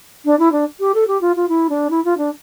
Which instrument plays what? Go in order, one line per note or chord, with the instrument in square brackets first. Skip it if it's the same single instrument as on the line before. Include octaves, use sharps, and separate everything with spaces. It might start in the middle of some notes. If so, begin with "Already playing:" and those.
[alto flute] D4
E4
D4
G4
A4
G4
F4
F4
E4
D4
E4
F4
D4